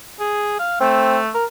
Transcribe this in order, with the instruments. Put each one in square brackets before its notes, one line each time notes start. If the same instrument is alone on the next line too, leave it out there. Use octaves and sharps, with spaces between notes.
[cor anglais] G#4
F5
[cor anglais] A3 [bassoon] C4
[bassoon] A#4